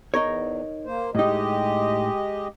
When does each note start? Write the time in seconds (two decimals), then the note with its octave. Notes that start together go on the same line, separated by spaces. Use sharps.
0.14 E2 D#4 A#4 C#5
0.85 A#3 C5
1.15 A2 G#3 D#4 G4 D#5